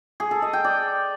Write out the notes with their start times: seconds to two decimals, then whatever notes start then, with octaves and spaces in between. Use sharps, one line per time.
0.20 G#4
0.31 A4
0.42 D#5
0.53 G5
0.65 D5